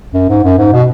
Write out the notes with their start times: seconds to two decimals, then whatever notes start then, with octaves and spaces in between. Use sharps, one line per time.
0.14 F#2
0.29 G#2
0.44 F#2
0.58 G#2
0.73 B2